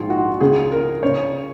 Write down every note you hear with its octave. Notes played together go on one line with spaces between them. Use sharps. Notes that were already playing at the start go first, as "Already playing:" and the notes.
Already playing: A#1 G#2 D#3 F4
F#4
C#2 C#3 G#4
A#4
C#3 C#5